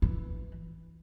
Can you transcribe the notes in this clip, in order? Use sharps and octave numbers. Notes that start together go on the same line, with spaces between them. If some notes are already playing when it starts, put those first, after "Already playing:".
E3